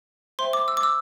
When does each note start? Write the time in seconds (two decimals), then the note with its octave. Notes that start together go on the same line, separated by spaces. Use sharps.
0.39 C5 E5 G5 C6
0.53 D6
0.68 E6
0.77 D6
0.83 E6